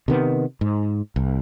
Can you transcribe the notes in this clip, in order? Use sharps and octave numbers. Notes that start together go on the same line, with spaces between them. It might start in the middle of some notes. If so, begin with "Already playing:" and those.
C3 D#3 B3
G#2
C2